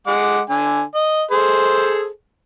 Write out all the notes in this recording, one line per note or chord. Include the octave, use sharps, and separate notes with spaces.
G#3 F#5 D6
D3 G#5
D#5
G#4 A4 C5